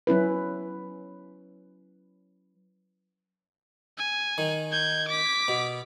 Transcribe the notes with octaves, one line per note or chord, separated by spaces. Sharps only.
F#3 C#4 E4 B4
G#5
D#3
G6 G#6
D6 B6
B2